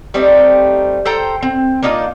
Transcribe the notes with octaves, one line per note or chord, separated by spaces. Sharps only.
G3 A3 C4 D#4
A4 C5 G5 A#5
C4
A#3 D4 D#4 F4